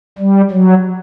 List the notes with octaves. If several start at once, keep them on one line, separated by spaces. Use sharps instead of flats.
G3
F#3